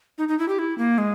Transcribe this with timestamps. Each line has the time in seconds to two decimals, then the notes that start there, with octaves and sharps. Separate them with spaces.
0.18 D#4
0.28 D#4
0.39 E4
0.48 G4
0.59 E4
0.78 A#3
0.98 G#3